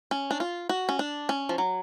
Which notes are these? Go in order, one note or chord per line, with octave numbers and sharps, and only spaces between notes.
C#4
D4
F4
F#4
C#4
D4
C#4
F3
F#3